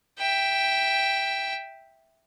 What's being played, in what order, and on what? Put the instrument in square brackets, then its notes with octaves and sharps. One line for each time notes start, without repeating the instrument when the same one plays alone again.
[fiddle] E5 G5